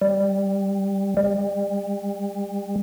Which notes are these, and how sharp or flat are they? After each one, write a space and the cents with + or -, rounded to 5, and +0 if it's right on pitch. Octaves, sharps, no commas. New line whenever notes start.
G3 +5
G3 +35